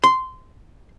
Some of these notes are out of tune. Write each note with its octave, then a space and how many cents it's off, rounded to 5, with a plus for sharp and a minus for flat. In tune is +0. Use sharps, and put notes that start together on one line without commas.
C6 -15